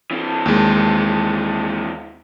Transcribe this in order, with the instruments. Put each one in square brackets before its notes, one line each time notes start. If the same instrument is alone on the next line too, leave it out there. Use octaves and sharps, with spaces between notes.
[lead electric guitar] E3 C4
[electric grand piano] D#2 G#3